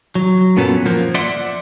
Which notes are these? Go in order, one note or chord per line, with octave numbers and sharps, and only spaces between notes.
F#3
F#2 A#2 B3 C#4 A4
F3 A#3
D5 E5 F#5 C6